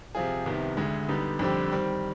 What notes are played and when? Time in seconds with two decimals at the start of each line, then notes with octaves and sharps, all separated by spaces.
0.15 C3 F3 C4 F4 G#4
0.46 C2 C3 D#3 B3
0.77 D2 D3 G#3
1.08 D3 G3 B3 D#4 G4
1.39 F2 D3 G3 C4 G4
1.71 D#3 G3 C4